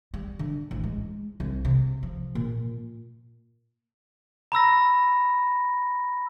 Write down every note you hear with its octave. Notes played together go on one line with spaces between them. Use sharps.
G3
D3
A1
G#3
C2
C3
F3
A#2
A#5 B5 E6 A#6